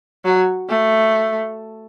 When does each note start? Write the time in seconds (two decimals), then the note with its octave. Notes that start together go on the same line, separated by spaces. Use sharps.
0.25 F#3
0.69 A3